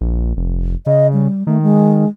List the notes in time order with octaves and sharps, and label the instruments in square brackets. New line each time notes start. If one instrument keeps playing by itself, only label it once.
[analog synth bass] A#1
F1
[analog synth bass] C#3 [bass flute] D#5
[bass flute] G3
[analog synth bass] D#3 [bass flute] A3
[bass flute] G#3